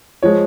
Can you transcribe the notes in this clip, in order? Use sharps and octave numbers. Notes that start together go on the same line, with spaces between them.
F3 G#3 C#5